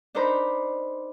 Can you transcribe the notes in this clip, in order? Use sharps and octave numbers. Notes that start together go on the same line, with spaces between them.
D4 D#4 A#4 C5 A#5 B5